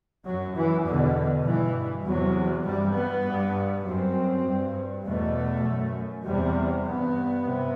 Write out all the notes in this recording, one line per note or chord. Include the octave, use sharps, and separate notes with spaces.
F#2 F#3
E3
E2 B2 D3
G2 E3
E2 C3 F#3
G2 G3
B3
G2
F#2 C4
G2
E2 B2 A3
F#2
E2 C3 G3
G2 B3
C3